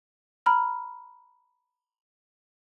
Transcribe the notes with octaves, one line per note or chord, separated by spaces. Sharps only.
A#5 B5 F6